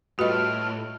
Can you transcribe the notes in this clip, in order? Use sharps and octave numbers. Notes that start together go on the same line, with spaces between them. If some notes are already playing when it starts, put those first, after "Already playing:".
A2 G3 F4 F#4 B4 D#5 F6